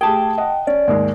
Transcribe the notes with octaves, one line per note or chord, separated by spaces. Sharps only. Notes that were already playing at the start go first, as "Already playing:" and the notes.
A3 G4 G#4 G5 A5
D#5 F#5
C#4 D5
D#2 G#2 G#3